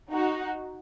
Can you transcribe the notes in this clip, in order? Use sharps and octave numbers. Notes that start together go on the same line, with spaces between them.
D#4 F#4